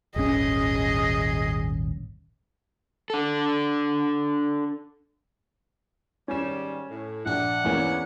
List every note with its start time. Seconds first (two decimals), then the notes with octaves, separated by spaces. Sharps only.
0.16 D#1 G#1 C#4 G#4 D#5
3.10 D4 A4
6.28 G#2 D#3 G3 C#4 E7
6.90 A2
7.26 A#1 D5 F#5
7.65 E2 A#3 C#4